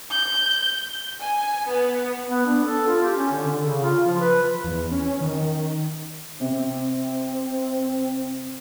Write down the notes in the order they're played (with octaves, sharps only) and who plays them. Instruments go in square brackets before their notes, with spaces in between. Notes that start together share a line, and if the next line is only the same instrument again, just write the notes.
[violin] G6
[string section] G#5
B3
[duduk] B3
D4
A4
F4
G4
C#4
D3
D3
C#3
F4
F3
B4
[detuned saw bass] E2
C#4
D#3
[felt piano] C3 [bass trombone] C4